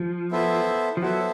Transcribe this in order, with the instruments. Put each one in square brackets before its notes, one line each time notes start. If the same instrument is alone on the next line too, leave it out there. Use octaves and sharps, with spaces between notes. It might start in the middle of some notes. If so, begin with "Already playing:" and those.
Already playing: [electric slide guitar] F3
[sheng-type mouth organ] B3 E4 A4 C5 E5
[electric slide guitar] F3
[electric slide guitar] F#3 [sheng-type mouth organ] B3 E4 A4 C5 E5